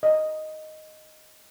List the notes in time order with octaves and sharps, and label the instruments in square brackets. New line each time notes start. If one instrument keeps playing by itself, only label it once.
[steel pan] D#5